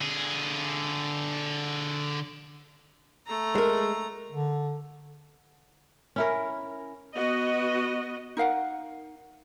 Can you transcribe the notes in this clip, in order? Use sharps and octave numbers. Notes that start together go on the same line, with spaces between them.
D3 G#4
A3 A#5
G#3 A#4
D3
C#4 E4 A#4
B3 F#4 D#5
D#4 A#4 F5 F#5